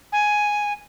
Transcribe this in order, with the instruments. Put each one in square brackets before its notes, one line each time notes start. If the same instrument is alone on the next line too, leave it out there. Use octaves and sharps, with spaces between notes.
[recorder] G#5